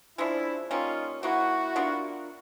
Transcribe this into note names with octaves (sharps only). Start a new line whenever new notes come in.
C#3 F3 G#3 D4 E4
G3 A#3 C#4 D#4 F4
F#3 A#3 D#4 E4 F#4
B3 D4 F4 A#4